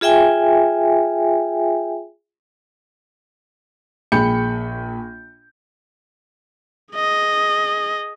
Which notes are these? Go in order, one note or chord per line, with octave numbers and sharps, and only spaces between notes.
F4 G#4 E5 G5 G#5
A#1 G#4 G5 B5 G6 C#7
G#4 D#5